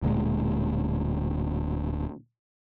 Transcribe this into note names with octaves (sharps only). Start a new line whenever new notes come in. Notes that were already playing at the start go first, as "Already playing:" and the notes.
D1 D2 A#2 G#3